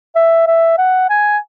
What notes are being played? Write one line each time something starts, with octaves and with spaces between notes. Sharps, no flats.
E5
E5
F#5
G#5